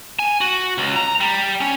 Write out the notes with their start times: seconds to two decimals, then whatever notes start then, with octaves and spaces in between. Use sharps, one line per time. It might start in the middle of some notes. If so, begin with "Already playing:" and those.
0.19 G#5
0.41 F#4
0.78 C#2
0.96 A#5
1.20 G3
1.61 C#4